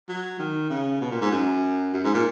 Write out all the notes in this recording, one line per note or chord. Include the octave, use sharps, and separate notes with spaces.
F#3
D#3
C#3
B2
A#2
G#2
F#2
F#2
G#2
A#2